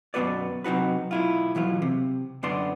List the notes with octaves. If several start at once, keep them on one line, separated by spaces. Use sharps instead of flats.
F#2 B2 B3 F#4 B4 D5
C3 F#3 D#4 F#4 B4
B1 E4 F4
B1 E3 F#3 F4
C3
F#2 D3 B3 D5 C6